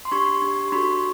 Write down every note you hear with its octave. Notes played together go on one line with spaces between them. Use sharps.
C6
D4 G4 B5 C#6
D4 G4
C6
D4 F#4 A4 B5 C#6